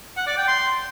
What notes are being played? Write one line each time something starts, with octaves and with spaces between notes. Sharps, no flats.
F#5
D5
G5
C6